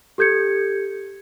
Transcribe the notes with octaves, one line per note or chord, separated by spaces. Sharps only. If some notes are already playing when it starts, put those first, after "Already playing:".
G4 A4 G6 G#6 C#7